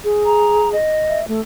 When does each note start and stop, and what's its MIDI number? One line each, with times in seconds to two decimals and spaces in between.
0.04 0.75 68
0.24 0.70 82
0.72 1.19 75
1.09 1.28 76
1.28 1.40 57